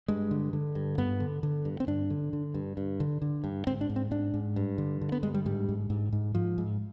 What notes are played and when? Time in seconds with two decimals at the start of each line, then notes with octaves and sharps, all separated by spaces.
0.08 G2 G#3
0.31 D3
0.53 D3
0.75 G2
0.98 G2 B3
1.20 D3
1.43 D3
1.65 G2
1.80 C4
1.87 G2 D4
2.10 D3
2.33 D3
2.54 G2
2.77 G2
3.00 D3
3.22 D3
3.44 G2
3.67 G#2 C4
3.81 D4
3.89 G#2
3.96 C4
4.11 G#2 D4
4.34 G#2
4.56 G2
4.78 D3
5.01 D3
5.12 B3
5.23 G2 G#3
5.34 G3
5.46 G#2 G3
5.69 G#2
5.90 G#2
6.13 G#2
6.35 G#2 F3
6.58 G#2